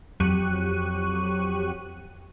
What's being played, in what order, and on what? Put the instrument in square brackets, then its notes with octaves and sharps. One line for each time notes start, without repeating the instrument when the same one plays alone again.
[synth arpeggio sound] F2 F#3 G4 C#6 F#6 D#7